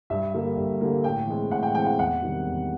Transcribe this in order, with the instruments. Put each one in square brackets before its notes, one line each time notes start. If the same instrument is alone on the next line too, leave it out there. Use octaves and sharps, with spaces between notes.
[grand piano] G2 [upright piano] E5
[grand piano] D3 G3 A#3
G2
D3 G3 A#3
[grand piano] A2 [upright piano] G5
[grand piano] E3 G#3 C4
[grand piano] A2 [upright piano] F#5
[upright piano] G5
[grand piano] E3 G#3 C4 [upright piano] G5
[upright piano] F#5
[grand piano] E2 [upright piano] F#5
[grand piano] C3 D#3 G3
E2